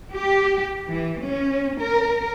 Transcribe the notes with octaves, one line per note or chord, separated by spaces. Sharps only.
G4
E3
C#4
A#4